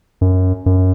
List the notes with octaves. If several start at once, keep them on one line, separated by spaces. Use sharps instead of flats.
F#2
F#2